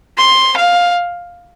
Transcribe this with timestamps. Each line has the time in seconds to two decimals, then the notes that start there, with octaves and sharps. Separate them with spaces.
0.18 C6
0.57 F5